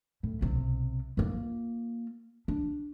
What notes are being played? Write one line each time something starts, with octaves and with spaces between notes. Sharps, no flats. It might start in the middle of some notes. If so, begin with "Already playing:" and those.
A2
B1 C3
A#3 F4
D4